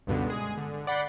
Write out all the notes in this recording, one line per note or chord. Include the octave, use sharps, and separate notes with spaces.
C#2 G2 B2 D3
G#3 G#4
D3
D5 F#5 B5 G6 C7